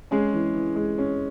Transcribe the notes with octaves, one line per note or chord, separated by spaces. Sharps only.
G#3 C#4 G#4
E3
E3
G#3
C#4